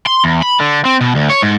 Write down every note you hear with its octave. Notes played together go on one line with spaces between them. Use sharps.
C6
E2
B5
D3
C4
B2
D2
C#5
G#2